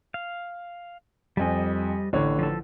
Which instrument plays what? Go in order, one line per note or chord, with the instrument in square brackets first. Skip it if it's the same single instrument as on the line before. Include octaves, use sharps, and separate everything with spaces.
[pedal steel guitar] F5
[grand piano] F2 G#5 [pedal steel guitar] G3 D#5
[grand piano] A1 D3 C#5
[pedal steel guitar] F3 A4